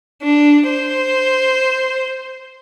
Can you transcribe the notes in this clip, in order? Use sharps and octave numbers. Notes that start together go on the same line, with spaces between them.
D4
C5